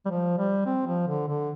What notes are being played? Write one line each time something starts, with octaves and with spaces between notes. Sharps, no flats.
G3
F3
G3
C4
F3
D3
D3